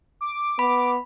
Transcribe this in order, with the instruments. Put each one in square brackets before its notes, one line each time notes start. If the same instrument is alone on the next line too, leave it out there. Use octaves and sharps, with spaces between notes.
[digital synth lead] D6
[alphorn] B3 [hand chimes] B5